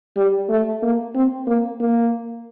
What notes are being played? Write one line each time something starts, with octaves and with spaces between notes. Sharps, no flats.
G3
A3
A#3
C4
A#3
A#3